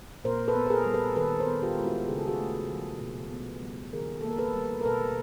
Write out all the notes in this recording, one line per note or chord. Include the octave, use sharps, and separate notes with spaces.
A#2 A#4 C5
A4 B4
B3
B4
G#4 A#4
G3
A4 B4
D#3 A4 B4
A#4 C5
B3
F4 G4
G#3 F4
E4 F#4
C#3 G#4
A4
F#4 G#4
A3
F3
B2
B3
G3
D#3 G#4 A#4
A#3 A4
A#4
A4 B4
G3
A#4
B2 A4 B4